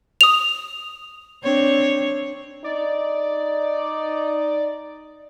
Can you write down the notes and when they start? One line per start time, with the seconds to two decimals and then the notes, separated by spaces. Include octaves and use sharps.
0.21 D#6 F7
1.44 C4 D4 C#5
2.64 D#4 D5